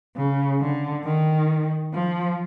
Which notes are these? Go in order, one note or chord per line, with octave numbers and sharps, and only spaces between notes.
C#3
D3
D#3
F3